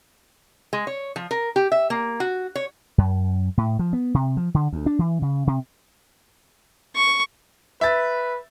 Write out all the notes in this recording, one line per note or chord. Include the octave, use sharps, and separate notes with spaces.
G#3
C#5
F3
A#4
G4
E5
A#3
F#4
C#5
F#2
A2
F3
B3
C3
F3
D3
D2
D4
E3
C#3
C3
C#6
B4 E5 A6